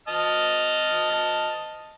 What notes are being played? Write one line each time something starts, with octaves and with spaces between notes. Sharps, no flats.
D#5 A5 F6